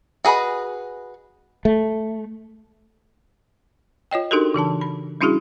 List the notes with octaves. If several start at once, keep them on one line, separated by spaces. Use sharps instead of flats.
F#4 G#4 A#4 B4 D#5
A3
F4 C#5 D#5 G5
D4 D#4 F#4 G4 A4 A#4
C#3 E3 D4 A5
B5
G3 C#4 D4 E4 F#4 G#4